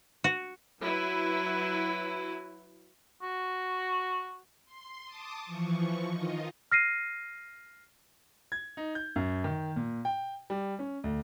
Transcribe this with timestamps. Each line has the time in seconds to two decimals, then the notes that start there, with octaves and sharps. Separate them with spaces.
0.24 F#4
0.81 F#3 E4 B4
3.22 F#4
4.65 C6
5.05 A5 D6 D#6
5.45 E3 F3 C#6
6.09 D#3 F4 D#5
6.72 F6 A#6 C7 D#7
8.52 G#6
8.77 D#4
8.95 G6
9.16 F#2
9.44 D#3
9.76 A#2
10.05 G5
10.50 G3
10.79 C#4
11.04 D2